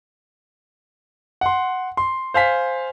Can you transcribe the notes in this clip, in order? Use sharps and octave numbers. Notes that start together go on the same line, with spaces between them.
F#5 C6
C6
C5 F5 G#5 B6